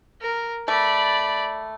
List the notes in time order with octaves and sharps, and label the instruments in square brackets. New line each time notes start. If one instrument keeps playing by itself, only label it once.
[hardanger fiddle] A#4
[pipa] A3 [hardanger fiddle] D5 B5